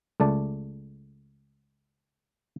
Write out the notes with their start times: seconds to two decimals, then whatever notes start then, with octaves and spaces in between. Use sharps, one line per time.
0.20 C#2 A3 D5 A5